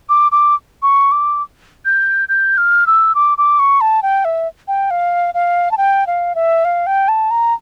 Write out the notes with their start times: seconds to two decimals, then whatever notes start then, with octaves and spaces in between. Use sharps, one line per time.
0.09 D6
0.32 D6
0.82 C#6
1.12 D6
1.85 G6
2.29 G6
2.58 F6
2.87 E6
3.15 D6
3.38 D6
3.59 C#6
3.81 A5
4.03 G5
4.25 E5
4.68 G5
4.91 F5
5.34 F5
5.71 A5
5.77 G5
6.07 F5
6.35 E5
6.65 F5
6.86 G5
7.08 A5
7.31 A#5